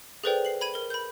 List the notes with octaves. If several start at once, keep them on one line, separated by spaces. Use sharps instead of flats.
G#4 A4 B4 C5 D5 G5
C7 F#7
B5 G#6 D#7
A#4 G7
B5 G6